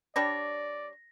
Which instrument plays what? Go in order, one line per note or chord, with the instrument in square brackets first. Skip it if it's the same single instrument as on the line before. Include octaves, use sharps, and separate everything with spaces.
[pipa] G3 D4 C#5 [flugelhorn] D5 [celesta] A#6